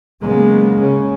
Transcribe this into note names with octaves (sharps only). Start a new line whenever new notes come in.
C#3 F#3 G#3 A#3 B3
C#3 C#4